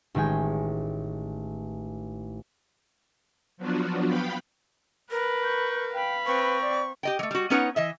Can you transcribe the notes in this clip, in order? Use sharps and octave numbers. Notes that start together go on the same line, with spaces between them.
A1 D#3 G#3 G5 G#5
F3 F#3 B3 D4 F4 F#4
B3 F5 G5 B5
A#4 B4
C#6 G6
F5 G5 B5
C4 B4 C#6
D5
G4 D#5 G5
F#3 A3
G3 F#4
B3 C#4 D#4 B4 C#5 F#5
E3 D#5 E5